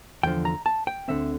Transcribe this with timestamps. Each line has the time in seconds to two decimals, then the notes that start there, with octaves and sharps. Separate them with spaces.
0.23 E2 D3 F3 G5
0.45 A#5
0.66 A5
0.87 G5
1.08 D2 D3 F3 C4 E5